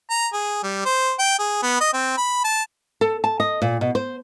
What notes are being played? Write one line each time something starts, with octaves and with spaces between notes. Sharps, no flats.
A#5
G#4
G3
C5
G5
G#4
B3
D#5
C4
B5
A5
A4
A5
D#5
A#2
B2
C5